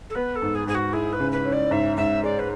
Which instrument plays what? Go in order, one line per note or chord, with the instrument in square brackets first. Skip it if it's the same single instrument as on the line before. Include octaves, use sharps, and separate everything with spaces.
[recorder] A4
[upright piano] B3 [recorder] B4
[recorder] A4
[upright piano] G#2
[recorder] G#4
[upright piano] G#2 [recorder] G#4
[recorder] F#4
[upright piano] E4 [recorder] G#4
[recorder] B4
[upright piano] C#3
[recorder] B4
[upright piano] C#4
[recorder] D5
[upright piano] G#2 [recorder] E5
[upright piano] G#2 [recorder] E5
[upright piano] G#3 [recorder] D5
[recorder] B4